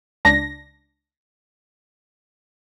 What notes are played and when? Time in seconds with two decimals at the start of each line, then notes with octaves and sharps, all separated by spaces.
0.25 C#2 D4 A#6